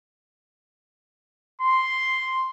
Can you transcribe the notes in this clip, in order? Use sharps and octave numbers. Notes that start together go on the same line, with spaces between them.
C6